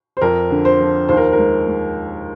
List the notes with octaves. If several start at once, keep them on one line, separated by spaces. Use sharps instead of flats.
C5
F2 A#4
D3
C5
F3
D#2 C5
A#4
A#4
G#3
G#3